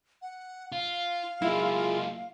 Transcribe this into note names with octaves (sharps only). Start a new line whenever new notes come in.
F#5
F4 F5
F#3 G#3 A#3 E4 F4